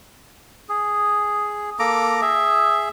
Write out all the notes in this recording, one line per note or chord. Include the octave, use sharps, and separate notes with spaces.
G#4
A#3 A4 A#5 D6
G#4 E5